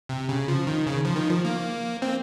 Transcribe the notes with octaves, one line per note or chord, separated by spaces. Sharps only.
C3
C#3
F3
D#3
C#3
F3
D#3
F3
A#3
C4